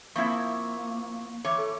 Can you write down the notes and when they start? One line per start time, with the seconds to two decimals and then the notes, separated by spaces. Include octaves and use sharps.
0.16 F3 A#3 C4 E4 C#6 G#6
1.45 E3 C#5
1.58 A4